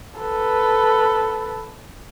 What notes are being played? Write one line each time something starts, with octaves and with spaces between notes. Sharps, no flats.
A4 B4